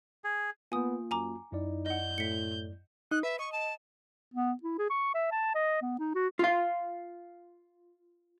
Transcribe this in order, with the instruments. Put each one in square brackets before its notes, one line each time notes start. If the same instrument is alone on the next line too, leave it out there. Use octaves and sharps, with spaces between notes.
[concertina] G#4
[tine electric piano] A#3 F4 [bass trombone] B3 [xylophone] G#5 D#6
[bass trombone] F#2 [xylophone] G#5 A#5 D6
[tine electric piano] F#2 E4 D5 [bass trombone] D#4
[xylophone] D#5 F#5 [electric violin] G6
[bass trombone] A2 [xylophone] B6 C#7
[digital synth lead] D#4 [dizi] F#6
[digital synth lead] B4 [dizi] E5
[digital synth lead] D#5 [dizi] C#6
[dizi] A5
[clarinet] B3
E4
G#4
C#6
E5
A5
D#5
B3
D#4
F#4
[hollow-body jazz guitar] F4 F5